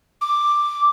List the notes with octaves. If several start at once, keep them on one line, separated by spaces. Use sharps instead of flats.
D6